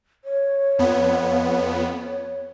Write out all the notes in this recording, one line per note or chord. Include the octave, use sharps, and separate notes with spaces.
C#5
F2 B3
C#5